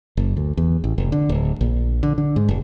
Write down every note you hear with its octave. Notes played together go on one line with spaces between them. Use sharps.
F#1
D2
E2
A1
F1
D3
D1
A#1
D3
D3
G#2
F1